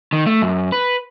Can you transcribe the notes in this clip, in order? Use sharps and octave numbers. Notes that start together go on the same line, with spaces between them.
D#3
A3
F#2
B4